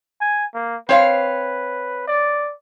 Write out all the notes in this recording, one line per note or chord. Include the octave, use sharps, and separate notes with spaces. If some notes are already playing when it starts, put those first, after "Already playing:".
G#5
A#3
C4 B4 C#5 F5
D5